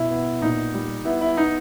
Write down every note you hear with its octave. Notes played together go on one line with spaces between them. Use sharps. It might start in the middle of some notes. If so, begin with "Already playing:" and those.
Already playing: B2 E4
B3
A#2 D#4
G3
B3 E4
E4
B3 D#4